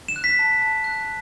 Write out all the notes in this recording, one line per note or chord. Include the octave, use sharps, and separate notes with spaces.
E7
F#6
B6
A5
A5
F#6